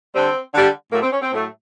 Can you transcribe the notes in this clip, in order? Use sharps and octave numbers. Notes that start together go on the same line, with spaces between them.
D3 G3 C4
D3 G3
A2 F#3 A3 A#3
C4
C#4
C4
A2 F#3 A3